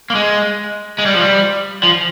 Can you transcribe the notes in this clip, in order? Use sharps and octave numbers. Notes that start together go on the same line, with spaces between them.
A#3
G#3
G#3
G3
F3
G3
F3